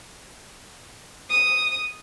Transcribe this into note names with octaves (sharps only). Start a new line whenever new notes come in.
D#6